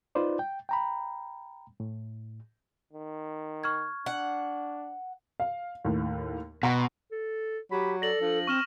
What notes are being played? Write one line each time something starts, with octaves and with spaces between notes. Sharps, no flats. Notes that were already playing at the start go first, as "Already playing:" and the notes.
D#4 F4 B4 C5 D5
G5
G5 A#5 B5
A2
D#3
C#6 F6 G#6
D4 F#5
F5
D#2 A2
B2 F#5 A#5 C6
A4
F#3 G4 B5
A4 D5 A#6 F#7
F3 D4
C4 C#6 F6 E7